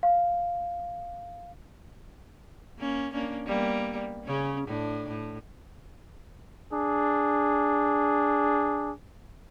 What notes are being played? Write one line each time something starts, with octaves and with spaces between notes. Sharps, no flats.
F5
A#3 C#4
A#3 C#4 D4
G3 A#3 B3
C#3 C#4
A2 D4
A2
D4 G#4